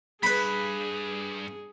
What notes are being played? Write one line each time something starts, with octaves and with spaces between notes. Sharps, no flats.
G2 G#4 B4 B5